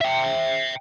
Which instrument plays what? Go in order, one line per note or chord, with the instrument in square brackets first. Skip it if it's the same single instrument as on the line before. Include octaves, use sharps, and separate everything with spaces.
[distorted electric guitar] E5 G5